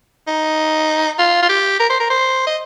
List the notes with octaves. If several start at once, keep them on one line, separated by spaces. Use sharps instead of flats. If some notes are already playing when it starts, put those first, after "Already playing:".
D#4
F4
F4
G4
A#4
C5
A#4
C5
D#5